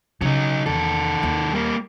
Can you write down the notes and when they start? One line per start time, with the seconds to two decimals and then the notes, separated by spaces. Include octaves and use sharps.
0.21 C#3 F#3 D#4
0.66 E2 D#3 A4
1.23 D#2
1.54 G3 A#3